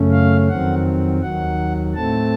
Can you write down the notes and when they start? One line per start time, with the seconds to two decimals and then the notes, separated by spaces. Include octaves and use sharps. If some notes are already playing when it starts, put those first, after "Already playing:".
Already playing: F#2 C#3 A3 C#4
0.12 F5
0.48 F2 D#3 F#3 C4 F#5
1.22 D#2 D#3 F#3 F#5
1.94 A2 A3 C4 A5